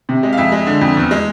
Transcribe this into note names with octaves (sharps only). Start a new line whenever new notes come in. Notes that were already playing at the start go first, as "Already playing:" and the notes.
C3
G#3
F5
F2 E5
G#3
D3
F2
E2
G#3